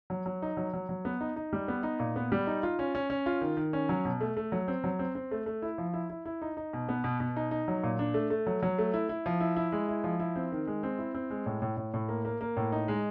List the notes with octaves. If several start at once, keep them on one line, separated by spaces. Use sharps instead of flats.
F#3
F#3
D#4
F#3
F#3
F#3
B3
D#4
D#4
G3
B3
D#4
A#2
B3
G3
D#4
F4
C#4
C#4
C#4
F4
D#3
D#3
C#4
F#3
B2
A3
A3
F#3
C4
F#3
C4
C4
A3
A3
E4
F3
E4
E4
E4
D#4
D#4
B2
B3
B2
B2
D#4
D#4
F#3
A#2
D4
A3
A3
F#3
F#3
A3
E4
E4
F3
E4
E4
G#3
E4
F3
E4
C4
D#3
G#3
C4
E4
C4
G#3
A2
A2
A2
A2
A#3
A#3
A#3
A2
D#4
G#3